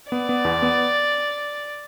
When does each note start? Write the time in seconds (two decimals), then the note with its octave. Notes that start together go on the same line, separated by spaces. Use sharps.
0.12 B3 D5
0.29 B3
0.45 E2
0.62 B3